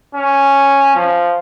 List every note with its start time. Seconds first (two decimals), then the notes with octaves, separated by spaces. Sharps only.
0.15 C#4
0.96 F3